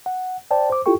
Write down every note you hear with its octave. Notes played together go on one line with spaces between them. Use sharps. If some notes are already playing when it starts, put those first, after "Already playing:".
F#5
C5 D5 G5 A5
C5 D6
E4 F4 G4 A4 G5 C#6